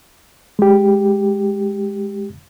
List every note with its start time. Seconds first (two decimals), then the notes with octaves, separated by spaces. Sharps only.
0.59 G#3 G4